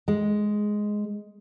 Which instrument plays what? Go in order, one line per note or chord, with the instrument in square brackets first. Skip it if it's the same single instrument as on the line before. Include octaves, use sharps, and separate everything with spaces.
[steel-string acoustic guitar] G#3